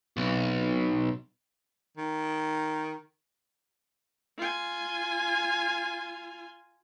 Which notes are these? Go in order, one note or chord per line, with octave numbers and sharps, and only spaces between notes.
B1 B2 F#3 C4
D#3
F4 G#5